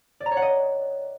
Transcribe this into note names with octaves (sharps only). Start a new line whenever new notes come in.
D5
A#5
C#5
F#5
D#5